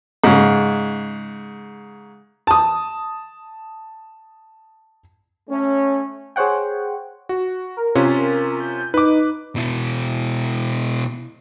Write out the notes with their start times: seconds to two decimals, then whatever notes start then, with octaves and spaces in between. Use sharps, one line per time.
0.24 G#2 C#3
2.47 A5 D#6
5.49 A3 C#4
6.36 G#4 C5 C#5 F#5 G5
7.29 F#4
7.77 A#4
7.95 C3 C#4 F4
8.60 G6
8.94 D#4 B4 D6
9.56 B2 E4